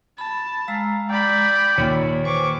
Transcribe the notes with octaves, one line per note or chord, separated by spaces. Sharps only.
A5 B5
G#3 F5 A#5 E6
D5 G5 B5
D#2 A#2 A#3 C#5
E3 C5 C#6 D6